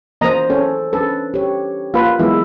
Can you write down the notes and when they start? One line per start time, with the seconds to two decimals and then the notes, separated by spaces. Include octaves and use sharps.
0.21 E3 A#3 C#4 C5 D#5 A#5
0.50 C#4 A4
0.93 C#4 D4 A4 B4
1.34 G4 C#5
1.94 A#3 F4 B4
2.19 E3 F#3 G#3 B3 E4